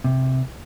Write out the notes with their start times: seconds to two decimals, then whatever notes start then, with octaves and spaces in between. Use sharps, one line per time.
0.04 C3